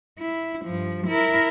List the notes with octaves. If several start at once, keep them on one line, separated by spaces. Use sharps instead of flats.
E4
G2 F3
E4 A#4